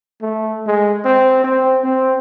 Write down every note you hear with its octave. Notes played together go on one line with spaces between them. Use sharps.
A3
G#3
C4
C4
C4